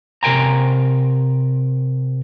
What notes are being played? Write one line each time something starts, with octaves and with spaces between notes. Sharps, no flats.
C3 A#4 G5 G#5 A#5